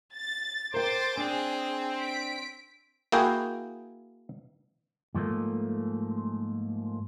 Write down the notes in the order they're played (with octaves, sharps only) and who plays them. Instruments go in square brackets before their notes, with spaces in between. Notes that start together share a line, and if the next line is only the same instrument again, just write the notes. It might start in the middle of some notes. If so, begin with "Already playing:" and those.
[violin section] A6
[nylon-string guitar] A#4 G5 [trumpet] C5 [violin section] C6 D6 A6
[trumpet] C4 [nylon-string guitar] D4 [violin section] G#4
[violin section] B6 D7
[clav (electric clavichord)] A#3 E4 F#4 G#4 G5
[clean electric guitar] G#2 F3 A3 A#3